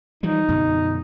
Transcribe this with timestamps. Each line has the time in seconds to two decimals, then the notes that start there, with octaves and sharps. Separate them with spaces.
0.23 E3 F3 G3 D#4
0.48 F#2 B2 D3